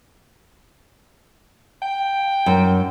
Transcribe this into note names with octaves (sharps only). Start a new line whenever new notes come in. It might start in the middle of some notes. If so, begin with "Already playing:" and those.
G5
F#2